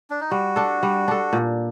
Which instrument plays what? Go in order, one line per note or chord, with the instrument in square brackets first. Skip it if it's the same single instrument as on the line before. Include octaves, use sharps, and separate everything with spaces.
[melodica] D4
D#4
[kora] G3 [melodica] F#4
[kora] D4 A4
G3
D4 A4
A#2